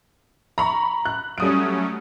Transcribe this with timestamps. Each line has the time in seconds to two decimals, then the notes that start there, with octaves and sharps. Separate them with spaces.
0.58 A#5 B5 C#6
1.05 F#6
1.38 F#3 G3 A3 C#4 D#6 D7